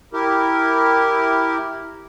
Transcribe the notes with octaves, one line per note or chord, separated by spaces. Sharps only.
E4 G4 A#4